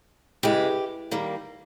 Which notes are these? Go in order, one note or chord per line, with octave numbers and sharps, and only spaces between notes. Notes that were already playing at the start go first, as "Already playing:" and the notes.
C#3 E3 G#3 G4
D#3 G3 A#3